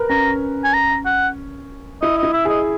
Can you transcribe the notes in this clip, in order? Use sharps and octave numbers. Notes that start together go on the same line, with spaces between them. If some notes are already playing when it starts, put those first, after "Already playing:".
Already playing: A#4 B4
C#4 A#5
G#5
A#5
F#5
E4 D#5
D#5
E4
E5
G#4 D#5